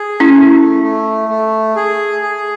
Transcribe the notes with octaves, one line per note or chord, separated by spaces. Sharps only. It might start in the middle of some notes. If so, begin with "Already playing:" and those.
Already playing: G#4
C#4 E4
A3
A3
A3
G#4
G#4